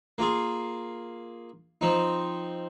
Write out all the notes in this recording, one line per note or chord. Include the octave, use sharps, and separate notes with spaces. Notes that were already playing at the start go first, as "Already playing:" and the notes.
A#3 F4 G#4
F3 C4 D#4